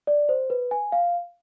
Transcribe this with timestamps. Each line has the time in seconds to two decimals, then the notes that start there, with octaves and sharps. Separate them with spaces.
0.07 D5
0.29 C5
0.50 B4
0.71 G#5
0.92 F5